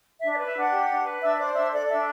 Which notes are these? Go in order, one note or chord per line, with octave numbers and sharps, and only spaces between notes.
D4 E5
D5
B4
E5
D4 F#5
G4
D4
B4
D4 E5
C5 D5
D4 E5
A4 D5
D4 E5